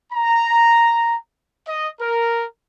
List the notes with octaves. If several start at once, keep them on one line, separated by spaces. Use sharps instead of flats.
A#5
D#5
A#4